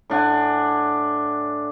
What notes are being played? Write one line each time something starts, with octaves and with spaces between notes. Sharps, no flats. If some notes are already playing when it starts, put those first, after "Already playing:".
A2 D4 F#5 G#5